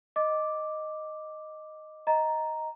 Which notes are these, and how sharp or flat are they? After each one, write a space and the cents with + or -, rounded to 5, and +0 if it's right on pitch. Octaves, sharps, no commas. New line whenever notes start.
D#5 +0 D6 +0
D#5 +10 A#5 +0